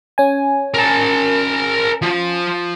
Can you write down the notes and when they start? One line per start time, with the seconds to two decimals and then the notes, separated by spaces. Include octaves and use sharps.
0.18 C#4 G#5
0.74 A#4 A5
2.02 F3